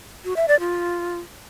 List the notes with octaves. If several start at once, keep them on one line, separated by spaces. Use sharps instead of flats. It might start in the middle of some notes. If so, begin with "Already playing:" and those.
F#4
E5
D5
F4